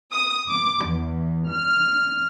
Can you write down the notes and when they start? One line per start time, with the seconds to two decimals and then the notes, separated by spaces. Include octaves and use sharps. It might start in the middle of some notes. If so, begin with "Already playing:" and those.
0.12 D#6
0.48 D6
0.87 E2
1.51 F6